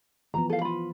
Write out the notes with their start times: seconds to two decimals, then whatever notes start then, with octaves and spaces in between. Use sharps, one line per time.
0.34 E3 F3 B3 A#5
0.50 A4 F5
0.62 F4 B5